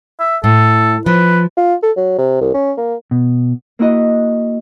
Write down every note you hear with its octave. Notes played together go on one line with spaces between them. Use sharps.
E5
A2 A4
F3 B4
F4
A4
F#3
C3
C2
C#4
A#3
B2
A#3 E4 F#4 D#5